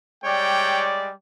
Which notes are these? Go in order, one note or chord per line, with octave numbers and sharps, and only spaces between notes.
G3 G#3 C#5 D5 G5